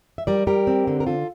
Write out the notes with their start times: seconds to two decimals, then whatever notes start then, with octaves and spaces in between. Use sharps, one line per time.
0.18 E5
0.27 G3 A#4 D5
0.47 G3 G4 A#4
0.67 C4
0.87 D3
1.00 A#4
1.07 D3 F4 A4